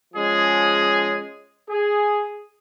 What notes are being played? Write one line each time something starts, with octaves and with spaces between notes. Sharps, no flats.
F3 G#3 C#4 G#4
G#4